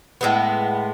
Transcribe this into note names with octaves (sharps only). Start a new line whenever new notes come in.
A2 G#3 B3